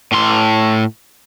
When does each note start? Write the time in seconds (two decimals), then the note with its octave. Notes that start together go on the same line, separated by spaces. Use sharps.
0.12 A2 C6